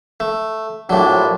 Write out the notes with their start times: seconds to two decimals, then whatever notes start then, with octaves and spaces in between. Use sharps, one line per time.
0.20 A3
0.90 A#1 A2 F#3 D4